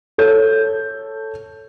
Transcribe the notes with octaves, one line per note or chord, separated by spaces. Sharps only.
A4 C#5 G6